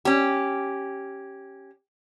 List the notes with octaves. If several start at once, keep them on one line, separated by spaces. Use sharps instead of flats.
C#4 G4